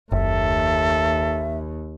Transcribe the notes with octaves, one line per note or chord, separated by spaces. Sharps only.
F#1 D#2 A4 E5